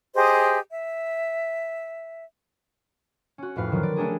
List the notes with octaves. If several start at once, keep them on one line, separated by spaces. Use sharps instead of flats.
G4 G#4 C5 D#5
E5
C#4 F#4
F2 A2 B4 F5
D3 D#3 F3 F#3
D5
A3 C#4 D4 G4 G#4 A#5